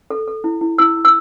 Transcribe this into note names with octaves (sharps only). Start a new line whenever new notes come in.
A4
A4
E4
E4
E4 E6
E4
E6